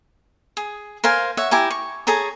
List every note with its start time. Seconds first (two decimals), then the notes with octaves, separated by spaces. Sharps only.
0.57 G#4
1.04 A#4 C5 F5 G#5
1.37 C#5 E5 F#5
1.51 E4 G4 G#5 A#5
1.70 C#6
2.07 G#4 A4 C#5 A#5